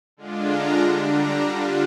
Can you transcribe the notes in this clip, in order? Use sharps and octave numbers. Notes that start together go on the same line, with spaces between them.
D3 G#3 D4 F4
A#5
D3 G3 D4 C6
A#5
D3 G3 D4 F4